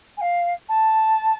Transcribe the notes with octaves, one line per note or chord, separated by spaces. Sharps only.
G#5
F5
A5